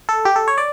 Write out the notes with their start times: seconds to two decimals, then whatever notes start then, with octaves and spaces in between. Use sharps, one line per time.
0.09 A4
0.25 G4
0.36 A4
0.48 C#5
0.58 D5